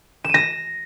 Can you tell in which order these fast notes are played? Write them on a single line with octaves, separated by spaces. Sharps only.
E7 D#7 A#6